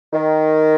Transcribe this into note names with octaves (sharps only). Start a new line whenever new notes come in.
D#3